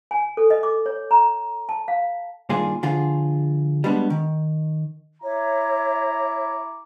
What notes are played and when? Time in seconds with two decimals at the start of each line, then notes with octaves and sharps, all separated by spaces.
0.11 G#5
0.37 A4
0.50 D#5
0.63 D6
0.86 C#5
1.11 A#5
1.69 A5
1.88 F5
2.49 G2 A#2 D#3 D4 F4 G#4
2.83 D3 F3 F4 G#4
3.84 G3 G#3 B3 D4
4.10 D#3
5.22 E4 C#5 E5 A#5 D6